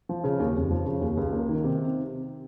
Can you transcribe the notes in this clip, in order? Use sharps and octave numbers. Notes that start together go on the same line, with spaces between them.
F3
C#3
D#2
F1
F3
C#3
D#2
C#2
A#3
D#3
C3